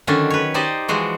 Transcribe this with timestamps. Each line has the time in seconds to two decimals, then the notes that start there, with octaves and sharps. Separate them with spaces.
0.07 D3 D#3 F#3 C#4 D4
0.30 B4 C#5
0.54 D#4 G4 C5 D5 D#5
0.88 E3 F3 G#3 F#4